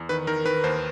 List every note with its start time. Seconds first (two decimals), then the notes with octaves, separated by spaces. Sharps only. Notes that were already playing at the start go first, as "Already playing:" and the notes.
Already playing: E2
0.09 D#3 B4
0.27 D#3 A#4
0.45 D#3 B4
0.64 D#2 C5